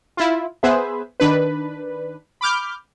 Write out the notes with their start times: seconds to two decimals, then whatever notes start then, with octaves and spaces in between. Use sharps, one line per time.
0.17 E4 F4
0.63 B3 G#4 B4 C5 E5
1.20 D#3 D4 B4
2.41 B5 D6 F6 G6